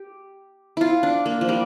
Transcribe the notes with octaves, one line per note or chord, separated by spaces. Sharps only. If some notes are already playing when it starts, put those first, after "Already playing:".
Already playing: G4
E4 F4
D4
A#3
F3
G3